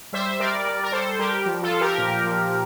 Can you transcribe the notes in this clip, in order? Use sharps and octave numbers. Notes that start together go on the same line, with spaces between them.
G3 C5 E5
G3 A#4 D5
G3
A#4
G3 A4 C5
G3 G4 A#4
F3
F4 A4
F3
G4 A#4
A#2
F3